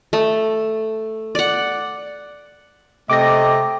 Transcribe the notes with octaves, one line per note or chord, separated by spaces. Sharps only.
A3
D5 F#5
C3 A3 D#5 G5 D6 A#6